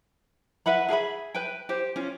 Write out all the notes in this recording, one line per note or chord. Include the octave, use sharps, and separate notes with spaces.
B4 E5 F#5 B5
G#4 A4 E5 B5
B4 G5
G4 C5
C#4 F4